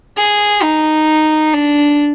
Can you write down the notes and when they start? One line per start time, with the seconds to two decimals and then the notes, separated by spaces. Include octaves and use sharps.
0.18 G#4
0.63 D#4
1.54 D4